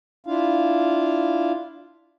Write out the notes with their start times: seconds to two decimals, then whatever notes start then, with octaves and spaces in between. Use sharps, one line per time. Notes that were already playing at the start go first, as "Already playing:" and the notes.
0.26 D4 E4 F4 F5